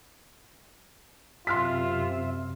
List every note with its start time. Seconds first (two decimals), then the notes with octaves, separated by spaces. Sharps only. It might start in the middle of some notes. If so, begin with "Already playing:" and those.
1.47 F#2 C3 F4 E5 C6 F6 B6